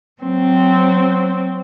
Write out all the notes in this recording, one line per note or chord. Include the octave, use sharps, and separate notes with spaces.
F#3 C4